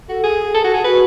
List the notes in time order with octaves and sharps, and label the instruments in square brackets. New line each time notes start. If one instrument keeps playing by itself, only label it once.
[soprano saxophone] F#4 [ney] A4
[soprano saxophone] G#4
A4
F#4
G#4
[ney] F#4 [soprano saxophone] B4